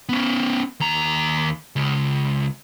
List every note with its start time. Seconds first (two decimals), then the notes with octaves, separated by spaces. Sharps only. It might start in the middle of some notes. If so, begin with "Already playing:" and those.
0.09 B3 C#4
0.80 D#2 A#5
1.76 C#2